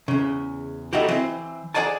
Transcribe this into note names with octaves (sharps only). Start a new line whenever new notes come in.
E2 C#3
A2 D#4 E4 F#4 G4
E3 C4
G#4 A4 D5 F#5 G#5 A5